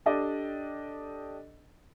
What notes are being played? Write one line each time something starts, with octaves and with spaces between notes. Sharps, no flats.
D4 G4 A4 D5 D#5